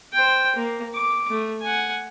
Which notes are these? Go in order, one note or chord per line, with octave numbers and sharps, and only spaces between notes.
C5 G5
A#3
D6
A3
F#5 G#5